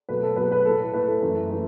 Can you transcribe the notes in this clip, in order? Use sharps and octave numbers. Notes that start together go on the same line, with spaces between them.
B2 F#3 A3 B4
A4
B2 F#3 A3 B4
B4
A2 A3 A4
A2 A3 B4
A4
F#2 E3 A3
E3 A3